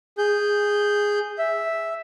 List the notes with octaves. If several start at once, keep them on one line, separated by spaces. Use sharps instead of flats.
G#4 G6
E5